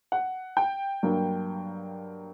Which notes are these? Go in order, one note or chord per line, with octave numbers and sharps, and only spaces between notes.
F#5
G5
G2 F#3 A#3